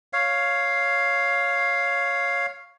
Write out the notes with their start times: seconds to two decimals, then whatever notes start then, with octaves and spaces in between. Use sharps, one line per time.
0.13 C#5 F5